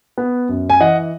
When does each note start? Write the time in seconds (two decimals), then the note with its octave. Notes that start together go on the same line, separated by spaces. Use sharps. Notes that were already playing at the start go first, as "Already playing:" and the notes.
0.18 B3
0.49 F#2
0.70 G#5
0.80 E3 D#5 F#5